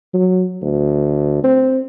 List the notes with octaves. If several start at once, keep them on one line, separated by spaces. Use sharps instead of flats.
F#3
D2
C4